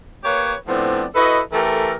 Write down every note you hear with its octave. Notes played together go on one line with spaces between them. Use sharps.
A#3 G4 B4 C#5
A2 F3 B3 C4 D4 D5
E4 F#4 A4 B4 D#5
E3 A3 G4 A4 A#4